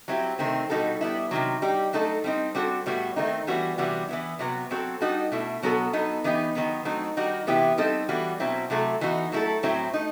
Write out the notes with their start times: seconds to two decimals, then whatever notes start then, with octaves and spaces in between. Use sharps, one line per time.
0.08 F#3 C4 E4 G4
0.39 C3 D#3 A3 C4
0.70 B2 G3 D#4 F#4 A4
1.01 G3 B3 E4
1.31 C3 D#3 F#3
1.62 G3 D#4 G4
1.93 F#3 A3 D#4 F#4 A4
2.24 G3 C4 D#4
2.55 G3 C4 F#4 A4
2.86 A2 G3 B3 F#4
3.16 D#3 A3 C4 D#4
3.47 E3 G3 B3 F#4
3.78 C3 E3 G3 B3 F#4
4.08 E3 B3 E4
4.39 C3 F#3 B3
4.71 F#3 C4 F#4 A4
5.01 G3 D#4 F#4 A4
5.32 B2 A3 E4
5.63 B2 F#3 B3 F#4 A4
5.93 F#3 B3 D#4 A4
6.24 E3 B3 D#4 G4
6.55 D#3 F#3 B3
6.85 F#3 A3 C4 D#4
7.17 D#3 G3 D#4 F#4
7.47 C3 E3 B3 E4 G4
7.78 G3 C4 D#4 A4
8.09 E3 G3 B3 F#4
8.40 B2 F#3 C4 E4
8.70 C3 F#3 A3 E4 A4
9.01 E3 B3 D#4 F#4
9.32 F#3 A3 E4 A4
9.63 A2 F#3 C4 E4
9.93 A3 D#4